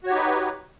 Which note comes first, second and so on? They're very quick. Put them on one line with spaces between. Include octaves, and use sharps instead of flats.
F#4 C#5 G4 D#4 B4